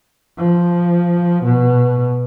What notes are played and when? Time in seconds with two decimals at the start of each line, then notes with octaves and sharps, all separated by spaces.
0.38 F3
1.44 B2